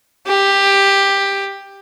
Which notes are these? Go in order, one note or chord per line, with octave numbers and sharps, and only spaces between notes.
G4